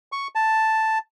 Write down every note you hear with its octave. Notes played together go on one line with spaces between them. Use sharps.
C#6
A5